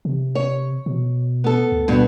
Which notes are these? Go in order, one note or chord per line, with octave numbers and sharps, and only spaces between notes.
C3
C#5
B2
B3 A4
D2
G2 B2